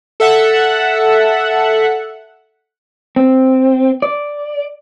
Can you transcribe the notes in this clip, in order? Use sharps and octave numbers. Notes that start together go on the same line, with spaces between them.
A4 E5 F#5
C4
D5